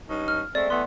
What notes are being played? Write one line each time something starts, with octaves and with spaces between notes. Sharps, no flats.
G2 C#4 D#4
F6
G#3 A3 C4 D5
E3 A3 B3 C6